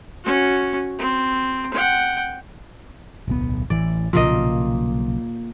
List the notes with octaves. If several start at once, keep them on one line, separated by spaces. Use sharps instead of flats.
C#4 F#4
C4
F#5 G5
D1 B1 B3
A1 E3 D5
B1 A#2 C#3 F3 A#3 D#5